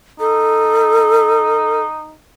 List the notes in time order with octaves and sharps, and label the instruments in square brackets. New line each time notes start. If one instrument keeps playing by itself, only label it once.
[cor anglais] D#4 [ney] A4